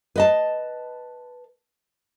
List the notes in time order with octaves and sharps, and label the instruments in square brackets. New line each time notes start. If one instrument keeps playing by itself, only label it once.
[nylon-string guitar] B4 D#5 A5